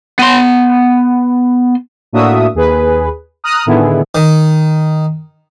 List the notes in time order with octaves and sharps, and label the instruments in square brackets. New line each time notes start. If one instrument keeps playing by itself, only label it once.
[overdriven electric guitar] B3 C6
[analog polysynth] A2 A#3 D4 F#4 E5 D#6
D#2 G#4 B4
A#5 D#6 F6 F#6
A2 D3 D#3 B3 E4 G#4
[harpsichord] D#3